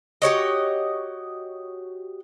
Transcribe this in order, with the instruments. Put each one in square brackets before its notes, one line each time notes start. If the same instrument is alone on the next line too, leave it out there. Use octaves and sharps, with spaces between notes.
[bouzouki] F#4 G4 C#5 D#5